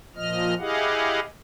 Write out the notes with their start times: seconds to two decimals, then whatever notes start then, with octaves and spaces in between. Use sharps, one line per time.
0.16 A#2 F3 D#5 F6
0.59 E4 G4 G#4 D#5 F5 F#5